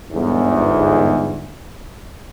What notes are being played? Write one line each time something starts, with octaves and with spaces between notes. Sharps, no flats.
G1 E2 G#2